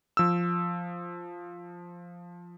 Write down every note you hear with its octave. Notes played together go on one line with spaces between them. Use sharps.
F3 E6